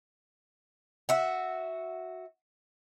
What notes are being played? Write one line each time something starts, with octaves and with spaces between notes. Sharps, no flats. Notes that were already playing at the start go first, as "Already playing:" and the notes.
F#4 E5